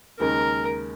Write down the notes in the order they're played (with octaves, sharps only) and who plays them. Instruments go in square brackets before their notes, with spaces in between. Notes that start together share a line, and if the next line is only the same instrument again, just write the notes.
[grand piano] D#2 C#3 G#3 D#4 [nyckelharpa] A#4